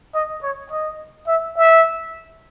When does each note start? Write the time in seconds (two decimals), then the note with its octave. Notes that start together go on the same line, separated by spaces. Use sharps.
0.15 D#5
0.43 C#5
0.71 D#5
1.28 E5
1.56 E5